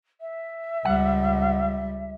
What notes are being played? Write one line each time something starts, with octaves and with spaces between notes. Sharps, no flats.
E5
C#2 G3 F#5